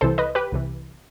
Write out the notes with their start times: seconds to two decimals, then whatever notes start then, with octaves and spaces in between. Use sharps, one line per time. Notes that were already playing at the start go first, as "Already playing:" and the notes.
0.01 C2 C3 E3 A4 C5
0.18 B4 D#5
0.35 G4 B4
0.52 C2 C3 E3